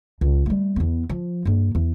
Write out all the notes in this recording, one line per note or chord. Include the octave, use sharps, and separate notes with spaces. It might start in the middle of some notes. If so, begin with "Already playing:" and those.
C#2
G3 A3
E2 B3
F3
G2 A#3
E2